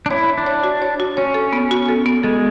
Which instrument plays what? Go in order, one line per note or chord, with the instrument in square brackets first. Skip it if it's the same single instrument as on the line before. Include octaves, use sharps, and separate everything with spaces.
[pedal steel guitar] D4
[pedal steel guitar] E4 [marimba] C#5
[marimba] C#5
[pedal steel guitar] D4
[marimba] C#5
F#4
C#5
F#4
[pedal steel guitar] C#4 [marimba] C#5
[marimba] A4
B3
F#4
A4
B3
[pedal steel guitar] G#3 [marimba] A4